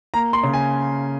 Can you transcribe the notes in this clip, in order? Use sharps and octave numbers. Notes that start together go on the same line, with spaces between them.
A#3 A#5
C6
C#3
G#5